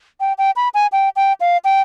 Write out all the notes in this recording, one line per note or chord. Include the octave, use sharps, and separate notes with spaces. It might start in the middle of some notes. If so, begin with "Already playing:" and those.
G5
G5
B5
G#5
G5
G5
F5
G5